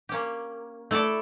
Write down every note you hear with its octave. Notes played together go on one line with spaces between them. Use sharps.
A#3 C#4 G4
A3 E4 A4 D5